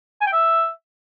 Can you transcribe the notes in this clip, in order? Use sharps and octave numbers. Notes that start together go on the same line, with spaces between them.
G#5
G5
E5